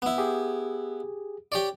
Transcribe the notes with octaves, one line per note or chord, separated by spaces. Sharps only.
B3 E4
G4 G#4
G4 C#5 D5